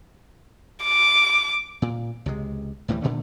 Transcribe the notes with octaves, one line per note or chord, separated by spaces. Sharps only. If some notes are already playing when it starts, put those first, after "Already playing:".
D6
A#2
C#2 C3 G#3
D2 A2 E3 G3
A#2 D3 D#3 A3